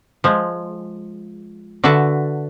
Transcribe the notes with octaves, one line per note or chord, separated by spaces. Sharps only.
F3 G#3
D3 F#4 B4 E5 A5